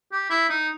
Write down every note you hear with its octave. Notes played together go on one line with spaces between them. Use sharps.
G4
E4
D#4